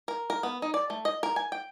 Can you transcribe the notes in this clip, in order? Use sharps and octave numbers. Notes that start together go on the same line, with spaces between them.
A#4
A#4
B3
D#4
D5
A3
D#5
A#4
G#5
G5